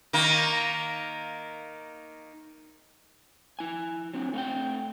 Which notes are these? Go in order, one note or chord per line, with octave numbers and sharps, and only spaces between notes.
D#3 A#3
E4 G#5
F#3 C4 D4
A3 C4 F5 G5